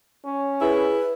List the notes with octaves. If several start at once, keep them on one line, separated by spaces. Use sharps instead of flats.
C#4
E4 G#4 B4